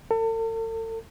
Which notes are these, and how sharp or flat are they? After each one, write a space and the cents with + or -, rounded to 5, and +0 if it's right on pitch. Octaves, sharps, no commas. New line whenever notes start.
A4 +40